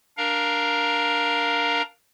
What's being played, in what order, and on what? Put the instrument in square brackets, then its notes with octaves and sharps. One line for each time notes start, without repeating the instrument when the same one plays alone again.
[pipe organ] D4 A#4 F5 A#5